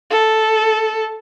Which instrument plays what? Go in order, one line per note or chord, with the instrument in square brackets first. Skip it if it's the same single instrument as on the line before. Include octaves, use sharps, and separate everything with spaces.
[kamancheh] A4